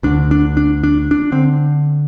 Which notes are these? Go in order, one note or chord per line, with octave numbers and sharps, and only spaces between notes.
D2 D3 D4
D4
D4
D4
D4
D3 C4